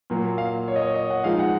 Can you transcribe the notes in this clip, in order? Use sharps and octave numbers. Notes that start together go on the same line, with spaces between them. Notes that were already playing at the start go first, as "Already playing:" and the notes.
A#2 F#3 A#3
F5
C#5
D#5
C#5
D#5
F#5
F3 G#3 D#4 F5
F#5